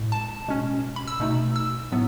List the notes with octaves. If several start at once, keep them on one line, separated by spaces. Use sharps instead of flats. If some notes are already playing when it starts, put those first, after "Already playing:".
Already playing: A2 G#3
A5
B2 G#3 C#4
B5
E6
B2 A3 D#4
E6
A2 F#3 B3